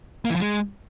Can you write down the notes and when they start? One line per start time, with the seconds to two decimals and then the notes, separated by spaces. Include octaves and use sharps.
0.25 A#3
0.30 E3
0.35 F3
0.41 G#3